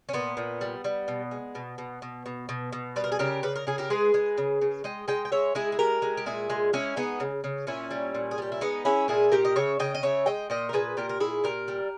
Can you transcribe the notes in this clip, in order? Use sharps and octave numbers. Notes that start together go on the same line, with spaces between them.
C#4
A#2 B3
A#2
G3
G3
B2
G#3
B2
B2
B2
B2
B2
B2
G3 B4
A#4
G#4
C#3 G4 A#4
C#3 B4
A#4
C#3 G#4
G4 A#4
G#3 G#4 B4
G#3
C#3
C#3
G#3 D#5 G5
G#3 D#5 G5
G5
G#3 C#5 E5
G#3 E4 G#4
G#4
G#3 G4 A#4
G#3
G4
A#2 E4 G#4
G#3
G#3 C#4 E4
G#3 B3 D#4
C#3
C#3
A#2 C#4 E4
G3
A#2
G#4
G3 G4
E4
G#3 B3 D#4
G#3 C#4 E4
A#2 E4 G#4
A#2 G4 A#4
D#5
C#3 C#5 E5
C#3 D#5 G5
D#5
C#3 C#5 E5
G#3 D#5 G5
A#2 D#5 G5
A#4
A#2 G#4 B4
A#2 G4 A#4
A#4
A#2 E4 G#4
A#2 G4 A#4
G3